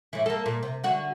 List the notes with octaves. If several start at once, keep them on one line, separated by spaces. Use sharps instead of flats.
A2 E3
A#3 A4
A#2
C3
D3 F#4